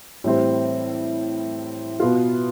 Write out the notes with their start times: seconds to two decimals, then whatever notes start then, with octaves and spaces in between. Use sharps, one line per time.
0.24 A2 E3 G3 C4 E4
2.00 B2 B3 F4